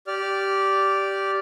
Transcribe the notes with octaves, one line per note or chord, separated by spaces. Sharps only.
G4 D5 F6